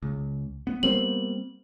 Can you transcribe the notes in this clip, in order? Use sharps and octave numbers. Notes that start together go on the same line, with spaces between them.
C#2
B3
G3 A#3 C4 F#7